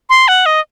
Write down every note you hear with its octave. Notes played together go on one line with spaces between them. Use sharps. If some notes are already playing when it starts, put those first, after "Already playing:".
C6
F#5
D#5